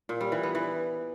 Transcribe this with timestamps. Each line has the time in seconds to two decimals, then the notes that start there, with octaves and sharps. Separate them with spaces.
0.09 A#2
0.21 G3
0.32 E3
0.43 B3
0.55 E3